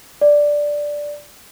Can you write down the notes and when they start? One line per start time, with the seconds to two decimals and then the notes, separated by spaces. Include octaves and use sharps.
0.21 D5